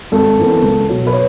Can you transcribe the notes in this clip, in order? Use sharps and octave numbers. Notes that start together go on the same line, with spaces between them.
G#1 A4
F#2 E3 B3
C#2
B2 F#3
B4
C#5